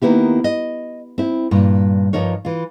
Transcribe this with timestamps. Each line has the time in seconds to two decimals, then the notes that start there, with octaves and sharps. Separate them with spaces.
0.02 D#3 A#3 B3 E4 G4
0.44 D#5
1.18 C4 E4
1.51 G2 A#2
2.13 G2 F3 D#4 A#4 C#5
2.45 E3 F4